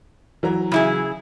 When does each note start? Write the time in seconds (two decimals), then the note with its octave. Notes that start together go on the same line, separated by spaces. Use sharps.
0.43 E3 F#3 A#5
0.72 C#3 E4 G#4